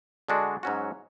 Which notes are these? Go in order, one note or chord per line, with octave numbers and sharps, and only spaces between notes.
D3 G#3 D4 F#4
G#2 F#3 C#4 F#4